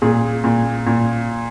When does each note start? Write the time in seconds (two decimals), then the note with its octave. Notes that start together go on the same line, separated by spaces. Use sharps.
0.02 A#2 G#4
0.44 A#2
0.87 A#2